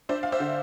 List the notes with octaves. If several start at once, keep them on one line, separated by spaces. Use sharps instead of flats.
D4 C5 E5
F5
C5 E5
D3